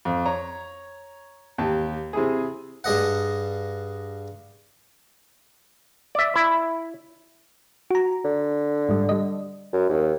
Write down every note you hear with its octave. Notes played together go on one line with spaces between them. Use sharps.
F2
C#5 A#5
D#2 G4 A5
C3 E4 G#4
G2 G#4 D#5 F#5
D5 E5
E4
F#4 A#5
D3
G#2 G3
G3 D#5
F#2
D#2